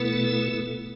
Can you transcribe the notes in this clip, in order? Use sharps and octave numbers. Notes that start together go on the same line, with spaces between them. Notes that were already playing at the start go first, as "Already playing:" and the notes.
Already playing: B2 A3 B3 E4 A4